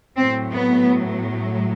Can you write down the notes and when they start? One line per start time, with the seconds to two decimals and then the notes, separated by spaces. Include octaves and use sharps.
0.17 A2 F#3 C4
0.52 B3